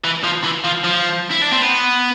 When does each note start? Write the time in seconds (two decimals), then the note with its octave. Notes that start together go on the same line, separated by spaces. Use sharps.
0.04 E3
0.24 F3
0.43 E3
0.64 F3
0.84 F3
1.31 E4
1.42 D4
1.52 C4
1.62 B3